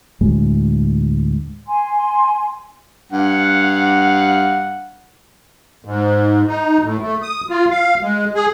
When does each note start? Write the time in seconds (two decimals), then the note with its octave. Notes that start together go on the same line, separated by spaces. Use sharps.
0.21 D2 A2 G#3
1.67 G#5 C6
3.12 G2 F5 F#5
5.85 G#2
6.47 D#4
6.83 A2
7.01 A3
7.23 D#6
7.49 F4
7.70 F5
8.02 G#3
8.35 G#4